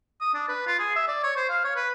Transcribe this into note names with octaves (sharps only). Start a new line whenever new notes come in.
D#6
D4
B4
F4
G#4
E5
D5
C#5
C5
F5
C#5
B4